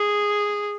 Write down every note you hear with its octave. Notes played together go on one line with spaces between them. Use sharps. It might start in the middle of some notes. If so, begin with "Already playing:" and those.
Already playing: G#4